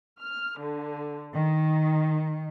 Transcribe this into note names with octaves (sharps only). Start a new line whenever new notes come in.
F6
D3
D#3